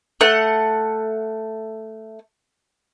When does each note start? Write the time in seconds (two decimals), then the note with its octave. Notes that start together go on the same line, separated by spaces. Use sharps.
0.21 A3 F#5